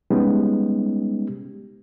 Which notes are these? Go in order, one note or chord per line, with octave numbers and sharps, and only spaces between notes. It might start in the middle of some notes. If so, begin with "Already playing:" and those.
G3 G#3 B3 C#4 D#4 G4